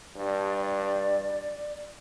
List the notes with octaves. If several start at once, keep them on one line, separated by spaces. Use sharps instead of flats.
G2 D5